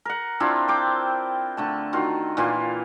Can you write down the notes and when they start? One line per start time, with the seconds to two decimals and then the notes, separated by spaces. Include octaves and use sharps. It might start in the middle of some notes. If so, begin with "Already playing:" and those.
0.05 A#4 F#5
0.40 C4 D4 E4 F4
0.68 C5 G5 D6
1.57 D3 A3 A5
1.93 D#3 F4 F#4
2.37 A#2 E3 F4 F5